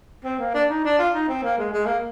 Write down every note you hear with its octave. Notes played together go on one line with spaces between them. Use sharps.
C4
A#3
D4
D#4
D4
F4
D#4
C4
A#3
G#3
G#3
A#3